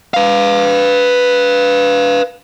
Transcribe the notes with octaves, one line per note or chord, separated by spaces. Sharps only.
B4 F5